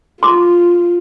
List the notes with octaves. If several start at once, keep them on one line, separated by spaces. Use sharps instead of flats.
F4 C6 D6